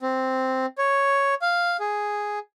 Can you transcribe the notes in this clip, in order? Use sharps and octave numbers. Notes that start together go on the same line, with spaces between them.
C4
C#5
F5
G#4